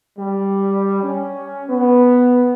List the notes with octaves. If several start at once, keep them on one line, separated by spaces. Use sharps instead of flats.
G3
C#4
B3